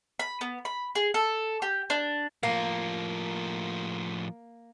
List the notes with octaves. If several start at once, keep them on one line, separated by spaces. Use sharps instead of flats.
B5
B3
B5
G#4
A4
G4
D4
A2 F3 A#3